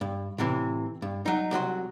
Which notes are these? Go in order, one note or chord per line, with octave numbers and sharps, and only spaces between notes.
G2
A2 C3 E3
G2
F#3 D#4
C2 F#3 F#4 C6